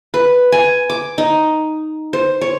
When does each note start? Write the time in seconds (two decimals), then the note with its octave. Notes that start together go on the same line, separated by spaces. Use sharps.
0.14 B4
0.52 G#5
0.90 D6
1.18 D#4
2.13 C5
2.41 C#5